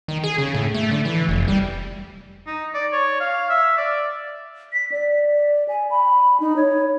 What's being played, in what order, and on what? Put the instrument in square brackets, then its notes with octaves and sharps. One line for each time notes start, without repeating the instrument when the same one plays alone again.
[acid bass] D#3
G#4
C#3
A2
A3
D3
E3
F1
G3
[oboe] D#4
D5
C#5
F5
E5
D5
[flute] B6
D5
G#5
B5
D#4
C#5